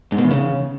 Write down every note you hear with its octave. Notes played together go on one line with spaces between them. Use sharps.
G#2
B2
E2
C#3